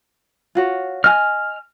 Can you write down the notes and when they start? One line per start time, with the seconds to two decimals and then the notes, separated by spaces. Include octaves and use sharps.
0.55 F4 F#4 C#5
1.04 D#5 G#5 F6